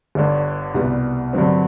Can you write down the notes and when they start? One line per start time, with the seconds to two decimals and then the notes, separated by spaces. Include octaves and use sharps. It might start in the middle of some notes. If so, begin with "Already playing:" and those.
0.15 G1 G2 D3
0.74 C2 B2 G3 B3
1.33 G2 D3 F#3 C4